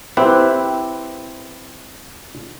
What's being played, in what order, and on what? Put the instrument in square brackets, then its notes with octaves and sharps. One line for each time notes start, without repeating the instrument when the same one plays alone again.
[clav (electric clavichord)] C4 E4 G4 B4